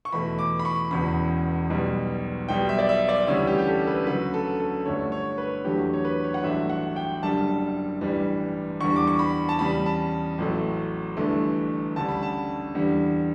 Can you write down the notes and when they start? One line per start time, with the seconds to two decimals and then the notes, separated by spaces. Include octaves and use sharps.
0.05 C#6
0.12 E2 B2 A3 B5
0.39 D6
0.59 B5
0.65 C#6
0.91 E1 E2 C#3 B5
1.70 B1 B2 G3
2.48 B1 B2 G3 G5
2.69 E5
2.79 D5
2.89 E5
3.09 D5
3.27 D2 C#3 E3 G3 C#5
3.47 G4
3.59 G4
3.67 A4
3.87 B4
4.07 D2 C#3 F#3 B4
4.34 A4
4.60 A4
4.86 G1 G2 D3 A3 C#5
5.12 C#5
5.38 B4
5.65 E2 D3 F#3 A3 G4
5.94 C#5
6.05 B4
6.24 C#5
6.34 F#5
6.43 A1 G2 F#3 A3 E5
6.69 F#5
6.96 G5
7.23 F#1 F#2 D3 G3 A5
8.01 A1 G2 E3 G3
8.81 E2 D3 G3 C#6
8.96 D6
9.07 C#6
9.19 B5
9.49 A5
9.59 E2 C#3 G3 B5
9.86 A5
10.38 A1 A2 F#3 A3
11.17 G1 G2 E3 A3
11.96 D2 C#3 G3 A5
12.09 B5
12.23 A5
12.75 E2 D3 G3